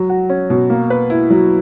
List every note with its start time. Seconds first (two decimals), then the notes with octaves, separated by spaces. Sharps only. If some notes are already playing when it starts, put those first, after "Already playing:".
Already playing: F#3
0.10 F#4
0.29 C#4
0.50 B2
0.70 A#3
0.90 B4
1.10 E4
1.30 F#3